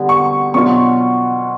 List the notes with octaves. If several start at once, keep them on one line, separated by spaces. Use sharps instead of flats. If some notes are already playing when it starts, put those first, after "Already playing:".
Already playing: D3 G3 B3
C#6
B2 F#3 B3 D4 F4 C#6